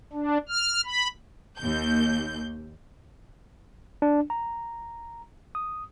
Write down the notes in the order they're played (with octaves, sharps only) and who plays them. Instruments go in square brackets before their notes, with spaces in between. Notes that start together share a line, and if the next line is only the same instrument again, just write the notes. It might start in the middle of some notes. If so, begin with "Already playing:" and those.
[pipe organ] D4
F6
B5
[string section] D#2 G6
[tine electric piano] D4
A#5
D#6